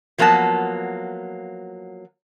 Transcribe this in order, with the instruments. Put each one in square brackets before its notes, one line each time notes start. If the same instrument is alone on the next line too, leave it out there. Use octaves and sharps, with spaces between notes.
[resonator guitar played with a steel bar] F3 F#3 A#3 B3 A5